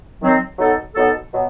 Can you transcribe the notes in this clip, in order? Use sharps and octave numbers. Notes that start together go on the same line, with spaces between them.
D#3 F#3 C4
B2 F#3 B3 D#4 A4
B2 F#3 B3 D#4 A4
B2 F#3 B3